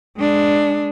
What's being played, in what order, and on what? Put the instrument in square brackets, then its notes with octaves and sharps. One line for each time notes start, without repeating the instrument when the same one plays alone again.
[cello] G#3 D4